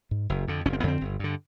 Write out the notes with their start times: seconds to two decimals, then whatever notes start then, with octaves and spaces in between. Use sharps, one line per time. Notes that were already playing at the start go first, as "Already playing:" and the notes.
0.11 G#2
0.29 F#1
0.48 F2 D3
0.65 F#1 C#4
0.73 C4
0.80 B3
0.83 F2 D3 C4
1.01 G1
1.19 G2 D3